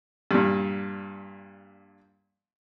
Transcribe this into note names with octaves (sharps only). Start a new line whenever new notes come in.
G2 A#2